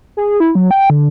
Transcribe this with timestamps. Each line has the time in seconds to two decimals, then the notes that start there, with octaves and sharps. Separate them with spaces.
0.17 G#4
0.40 E4
0.55 F#3
0.71 G5
0.90 D3